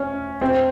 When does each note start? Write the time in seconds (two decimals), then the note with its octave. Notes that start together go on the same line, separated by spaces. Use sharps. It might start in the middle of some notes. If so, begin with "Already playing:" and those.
Already playing: C#4
0.41 C4